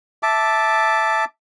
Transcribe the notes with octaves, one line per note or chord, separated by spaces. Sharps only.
E5 A5 D6